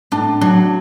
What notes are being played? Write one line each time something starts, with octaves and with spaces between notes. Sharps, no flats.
A2 D4
F#3 D4